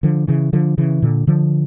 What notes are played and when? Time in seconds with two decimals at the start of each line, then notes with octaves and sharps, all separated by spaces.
0.03 D3 F3
0.28 C#3 E3
0.53 D3 F3
0.78 C#3 E3
1.02 A#2 D3
1.27 D3 F3